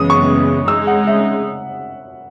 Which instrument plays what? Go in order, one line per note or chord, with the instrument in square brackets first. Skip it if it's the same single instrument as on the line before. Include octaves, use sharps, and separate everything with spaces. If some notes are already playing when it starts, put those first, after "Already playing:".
Already playing: [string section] F#2 C#3 E3 G#3 B3 [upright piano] D#6
[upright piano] C#6
[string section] C#3 G#3 D#4 [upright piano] E6
[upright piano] F#5
E5